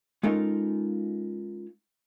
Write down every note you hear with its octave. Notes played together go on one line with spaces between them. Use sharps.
G#3 C#4 D#4 F4 A4 A#4